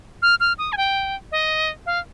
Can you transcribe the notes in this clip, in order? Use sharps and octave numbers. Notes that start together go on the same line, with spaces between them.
F6
F6
D#6
G#5
G5
D#5
F5